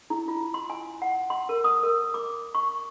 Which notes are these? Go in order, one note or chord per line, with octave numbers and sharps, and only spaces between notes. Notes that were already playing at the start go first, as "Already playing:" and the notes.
E4
F4
C6
G#5
F#5
C6
A#4
D#6
A#4
D6
C#6